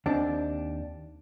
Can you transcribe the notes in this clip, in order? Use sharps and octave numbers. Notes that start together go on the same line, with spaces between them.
D#2 C4 D4